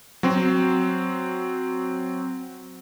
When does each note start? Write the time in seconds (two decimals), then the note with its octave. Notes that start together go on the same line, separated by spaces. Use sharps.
0.23 F#3 C4